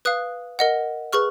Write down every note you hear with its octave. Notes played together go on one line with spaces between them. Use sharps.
B4 F5 D#6 F#6
A#4 D#5 F#5
G#4 B4 C#6 F6